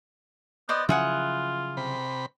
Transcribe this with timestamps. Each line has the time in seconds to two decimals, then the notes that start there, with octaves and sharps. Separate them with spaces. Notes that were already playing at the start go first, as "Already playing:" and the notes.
0.69 B3 C5 D5 D#5
0.89 C#3 F3 F#3 E4 F4 G#4 F#5
1.77 C3 B5